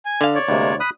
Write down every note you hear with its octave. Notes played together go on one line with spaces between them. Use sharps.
G#5
D3 F5
C#5 D5
D2 C3 G#3 A#3
B5 D#6 F#6